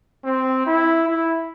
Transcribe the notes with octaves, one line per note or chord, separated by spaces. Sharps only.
C4
E4
E4